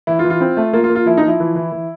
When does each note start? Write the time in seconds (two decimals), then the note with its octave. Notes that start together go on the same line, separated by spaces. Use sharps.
0.07 E3 E4
0.19 F4
0.24 E3
0.30 F4
0.41 C4
0.57 A3
0.73 A#3 F4
0.84 F4
0.90 A#3
0.95 F4
1.06 F3 E4
1.17 D#4
1.23 F3
1.28 E4
1.40 E3
1.56 E3
1.72 E3